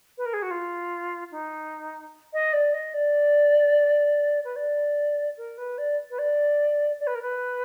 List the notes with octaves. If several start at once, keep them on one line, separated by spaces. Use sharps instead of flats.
B4
A#4
G#4
F#4
F4
D#4
D#5
D5
D#5
D5
B4
D5
A#4
B4
D5
B4
D5
D5
B4
A#4
B4